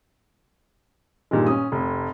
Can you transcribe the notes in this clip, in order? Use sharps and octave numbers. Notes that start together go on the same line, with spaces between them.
G2 A#2 D#3 G3 G#3
C#4 D#6
F1